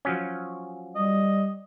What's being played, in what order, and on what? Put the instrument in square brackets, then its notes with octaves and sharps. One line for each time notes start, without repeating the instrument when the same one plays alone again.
[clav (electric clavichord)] F3 F#3 C#4
[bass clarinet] G3 [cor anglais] D#5